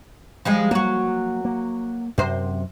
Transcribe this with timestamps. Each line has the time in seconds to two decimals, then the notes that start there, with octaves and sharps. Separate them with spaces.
0.45 F3 G3 G#3
0.71 F#3 A#3 F#4
1.45 A#3
2.18 F#2 C3 C5